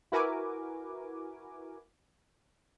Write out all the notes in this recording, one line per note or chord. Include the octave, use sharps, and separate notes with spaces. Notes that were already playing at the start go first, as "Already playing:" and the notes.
E4 F#4 A#4 B4 G#5 D6